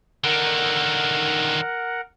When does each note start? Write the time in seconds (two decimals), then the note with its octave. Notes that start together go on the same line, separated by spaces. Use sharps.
0.24 D3 D#3 A#4 F#5